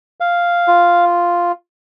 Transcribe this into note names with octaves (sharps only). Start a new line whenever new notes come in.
F5
F4